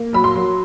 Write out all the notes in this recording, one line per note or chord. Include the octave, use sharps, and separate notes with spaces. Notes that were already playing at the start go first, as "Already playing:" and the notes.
Already playing: A#3
F#3 B5
C6
F#3